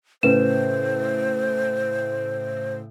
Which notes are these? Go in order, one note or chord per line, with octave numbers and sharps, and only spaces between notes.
A2 C#3 B4 C5 E7